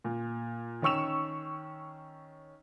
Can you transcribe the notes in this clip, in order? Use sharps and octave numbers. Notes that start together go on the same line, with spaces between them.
A#2
D#3 C#4 C#6 E6 E7